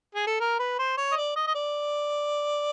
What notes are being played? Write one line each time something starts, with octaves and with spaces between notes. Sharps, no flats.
G#4
A4
A#4
B4
C5
C#5
D#5
D5
D#5
D#5
D5